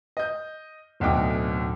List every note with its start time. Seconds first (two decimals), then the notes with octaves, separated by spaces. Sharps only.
0.17 D#5 G6
1.00 D1 D2 B2 D#4 G5 D6